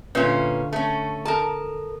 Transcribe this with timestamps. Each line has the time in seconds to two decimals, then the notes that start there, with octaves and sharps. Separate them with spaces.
0.15 A#2 D3 C#4 F4 B4 E5
0.73 A3 C#4 A5
1.25 A4 A#4 A5